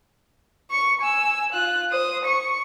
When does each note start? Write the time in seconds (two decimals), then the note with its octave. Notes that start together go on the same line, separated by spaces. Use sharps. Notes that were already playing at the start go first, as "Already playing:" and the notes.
0.70 C#6 C#7
1.01 G#5 E6
1.52 F4 F#6
1.91 C5 D#6
2.25 C#6 C#7